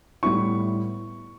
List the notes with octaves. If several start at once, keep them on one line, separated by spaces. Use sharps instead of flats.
A2 G3 B3 E4 C#6